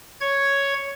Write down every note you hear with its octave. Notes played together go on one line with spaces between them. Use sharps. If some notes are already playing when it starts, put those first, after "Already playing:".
C#5 G#6